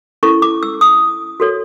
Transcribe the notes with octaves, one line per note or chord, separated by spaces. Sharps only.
C#4 E4 A4 C#6
D6
E6
D#6
F#4 A4 C#5